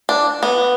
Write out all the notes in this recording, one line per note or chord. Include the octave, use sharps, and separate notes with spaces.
D4
B3